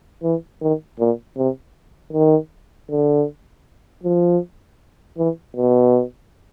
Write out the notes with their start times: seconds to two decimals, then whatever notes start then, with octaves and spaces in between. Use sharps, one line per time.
0.23 E3
0.61 D#3
0.99 A#2
1.37 C3
2.13 D#3
2.90 D3
4.03 F3
5.18 E3
5.56 B2